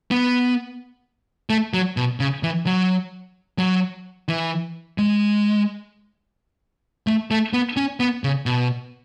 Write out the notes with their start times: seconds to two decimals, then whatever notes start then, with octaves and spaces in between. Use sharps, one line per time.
0.11 B3
1.50 A3
1.74 F#3
1.97 B2
2.20 C#3
2.43 E3
2.66 F#3
3.59 F#3
4.29 E3
4.98 G#3
7.07 A3
7.31 A3
7.53 B3
7.77 C#4
8.00 B3
8.24 C#3
8.46 B2